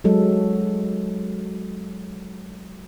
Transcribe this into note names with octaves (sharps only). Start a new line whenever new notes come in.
F#3 G#3 A4